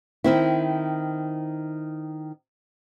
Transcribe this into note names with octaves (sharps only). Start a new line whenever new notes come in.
D#3 C4 E4